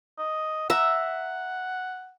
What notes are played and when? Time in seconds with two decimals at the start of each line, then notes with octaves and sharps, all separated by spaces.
0.18 D#5
0.70 E5 F#5 A#5